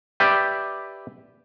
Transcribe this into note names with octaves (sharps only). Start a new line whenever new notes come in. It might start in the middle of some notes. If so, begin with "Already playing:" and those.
G4 B4 D5 E5 G5